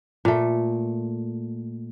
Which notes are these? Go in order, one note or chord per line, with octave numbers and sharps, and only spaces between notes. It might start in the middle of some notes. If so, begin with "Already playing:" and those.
A#2 A3